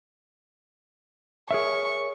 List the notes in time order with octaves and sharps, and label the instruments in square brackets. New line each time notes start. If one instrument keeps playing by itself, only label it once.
[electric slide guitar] G#4 A#4 E5 [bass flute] C#5 [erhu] C#6